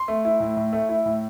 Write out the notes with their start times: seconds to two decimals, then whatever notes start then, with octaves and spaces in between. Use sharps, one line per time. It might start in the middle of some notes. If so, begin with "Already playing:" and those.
Already playing: C6
0.08 A3
0.25 E4
0.40 A2
0.57 A2
0.73 A3
0.89 E4
1.06 A2